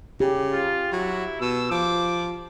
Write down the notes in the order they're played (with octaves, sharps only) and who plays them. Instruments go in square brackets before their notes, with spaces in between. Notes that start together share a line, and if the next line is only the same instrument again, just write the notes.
[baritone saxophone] C#3 [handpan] G4
[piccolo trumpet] F4
[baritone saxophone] F#3 [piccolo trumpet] E4
[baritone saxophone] B2 [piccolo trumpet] E6
[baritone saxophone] F3 [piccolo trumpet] D6